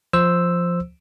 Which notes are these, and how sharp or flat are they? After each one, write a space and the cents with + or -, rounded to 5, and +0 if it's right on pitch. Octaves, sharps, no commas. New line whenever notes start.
F3 +0 C5 +0 E6 +0